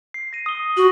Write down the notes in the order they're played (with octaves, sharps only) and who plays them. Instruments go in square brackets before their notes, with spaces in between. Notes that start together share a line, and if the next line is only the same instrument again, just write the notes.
[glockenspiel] C7
A#6 D#7
D#6 G7
[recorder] F#4 [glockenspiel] F#7